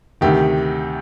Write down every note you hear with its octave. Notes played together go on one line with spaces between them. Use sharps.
D2 C3 D#3 G4